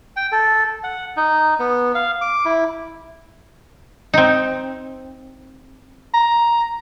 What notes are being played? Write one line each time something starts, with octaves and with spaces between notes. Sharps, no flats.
G5
A4
F#5
D#4
B3
F5
D6
E4
C4 D#4
A#5